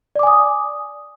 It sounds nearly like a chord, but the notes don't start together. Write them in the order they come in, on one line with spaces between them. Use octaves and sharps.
D5 D6 G#5 D#6